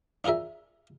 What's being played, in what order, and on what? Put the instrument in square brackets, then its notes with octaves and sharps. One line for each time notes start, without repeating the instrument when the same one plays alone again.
[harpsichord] D4 F4 G#4 A#4 E5